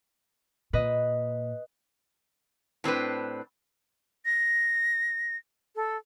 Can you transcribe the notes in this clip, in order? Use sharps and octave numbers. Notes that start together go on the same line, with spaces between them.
A#2 B4 D#5
A2 C4 D4 B4
A#6
A4